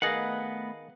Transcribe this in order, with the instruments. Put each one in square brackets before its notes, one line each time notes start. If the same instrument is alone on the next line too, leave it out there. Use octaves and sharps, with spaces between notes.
[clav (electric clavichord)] D#3 G#4 [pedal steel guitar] A3 B3 F#5 [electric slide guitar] B4 D#5 F5